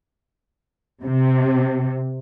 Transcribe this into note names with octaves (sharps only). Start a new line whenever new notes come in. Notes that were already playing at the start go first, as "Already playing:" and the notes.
C3